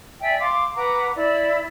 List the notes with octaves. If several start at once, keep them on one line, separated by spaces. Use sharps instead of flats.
D5 E5 G5 G#5
F5 C6 D6
B4 F#5 A#5 D6
E4 D5